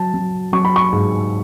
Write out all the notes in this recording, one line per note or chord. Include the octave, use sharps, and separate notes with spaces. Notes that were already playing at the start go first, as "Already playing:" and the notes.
Already playing: F#3 A5
F#3
F#3 C#6
B5
C#6
G#2